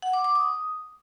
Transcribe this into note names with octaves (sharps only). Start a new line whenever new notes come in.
F#5
D6
D6
D#6